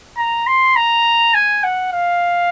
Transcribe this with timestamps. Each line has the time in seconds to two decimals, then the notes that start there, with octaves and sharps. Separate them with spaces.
0.18 A#5
0.47 C6
0.76 A#5
1.34 G#5
1.64 F#5
1.92 F5